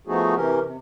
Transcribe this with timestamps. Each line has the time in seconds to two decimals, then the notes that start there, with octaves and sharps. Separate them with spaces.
0.07 F3 A3 B3 D#4 F#4 G#4
0.35 C3 E3 C#4 G4 A#4
0.63 C3